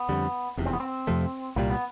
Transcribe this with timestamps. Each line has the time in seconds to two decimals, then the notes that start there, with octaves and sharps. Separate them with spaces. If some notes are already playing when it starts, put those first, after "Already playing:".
Already playing: B3
0.09 F2 D3 G3
0.57 F1 E2 C3
0.66 C4
0.73 B3
0.80 C4
1.07 F2 C3 F3 A3
1.56 C2 A#2 G3 A#3
1.70 B3